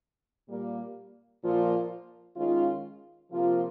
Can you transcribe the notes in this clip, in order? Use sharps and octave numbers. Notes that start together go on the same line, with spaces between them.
A#2 G3 A#3
A#2 F3 A#3 F4
D#3 G#3 C#4 F4
C3 F3 A#3 F4